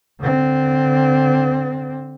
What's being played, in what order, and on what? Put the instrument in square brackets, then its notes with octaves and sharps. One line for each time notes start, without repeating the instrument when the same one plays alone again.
[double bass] D3 C4